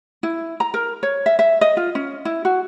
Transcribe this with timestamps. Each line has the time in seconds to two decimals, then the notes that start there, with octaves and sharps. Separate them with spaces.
0.23 E4
0.60 A#5
0.74 A#4
1.03 C#5
1.26 E5
1.39 E5
1.61 D#5
1.77 F4
1.95 C#4
2.25 E4
2.45 F#4